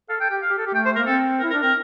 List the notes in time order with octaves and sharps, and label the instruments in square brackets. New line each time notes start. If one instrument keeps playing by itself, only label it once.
[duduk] A4 [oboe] F5
[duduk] A4 [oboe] G5
[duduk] G4 [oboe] G5
[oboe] F5
[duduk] G4
A4
G4
[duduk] A3 [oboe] G5
[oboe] C5
[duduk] A#3 [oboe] A#4
[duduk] C4 [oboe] A4
[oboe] A#4
[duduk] E4
[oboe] A#4
[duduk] D4
[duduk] C4 [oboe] A#4